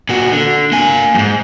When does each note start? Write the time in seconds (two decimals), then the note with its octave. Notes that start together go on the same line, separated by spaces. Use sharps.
0.09 A#2 F#4
0.32 D3
0.72 A#3 G#5
1.14 F2 G#2